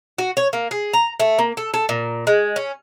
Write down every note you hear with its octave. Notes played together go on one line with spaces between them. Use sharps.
F#4
C#5
A#3
G#4
A#5
A3
A#3
A4
A4
A#2
G#3
C#4